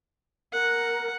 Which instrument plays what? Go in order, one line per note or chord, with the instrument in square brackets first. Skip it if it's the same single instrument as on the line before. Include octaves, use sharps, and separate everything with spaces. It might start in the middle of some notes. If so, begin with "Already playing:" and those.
[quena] A#4 [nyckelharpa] F#5